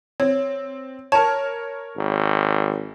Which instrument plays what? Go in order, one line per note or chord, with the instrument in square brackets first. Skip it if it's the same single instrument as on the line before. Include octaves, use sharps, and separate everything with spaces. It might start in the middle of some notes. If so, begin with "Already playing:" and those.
[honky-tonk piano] C4 [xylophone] C#5
[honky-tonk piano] A#4 C#5 [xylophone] A5
[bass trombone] G#1